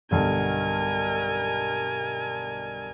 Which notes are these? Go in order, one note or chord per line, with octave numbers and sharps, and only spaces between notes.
B1 G2 D3 A#4 G#5